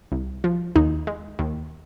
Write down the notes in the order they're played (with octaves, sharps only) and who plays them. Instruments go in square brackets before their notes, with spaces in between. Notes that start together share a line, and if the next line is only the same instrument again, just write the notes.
[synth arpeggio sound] C2
F3
D#2 D#4
G#3
D#2